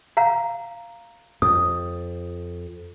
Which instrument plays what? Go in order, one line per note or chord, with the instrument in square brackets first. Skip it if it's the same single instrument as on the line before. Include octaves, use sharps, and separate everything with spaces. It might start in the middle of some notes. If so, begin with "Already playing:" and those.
[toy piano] F5 F#5 A#5
[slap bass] F2 [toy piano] D#6